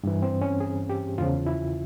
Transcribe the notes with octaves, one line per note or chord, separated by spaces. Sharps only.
G2 E3
C4
C#4
G#4
G4
E2 C#3 F3 F4
E4